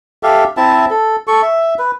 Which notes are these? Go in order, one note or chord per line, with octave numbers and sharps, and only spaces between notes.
G4 A4 E5 F5
C4 E4 E5 A5
A4
A4 C#6
E5
B4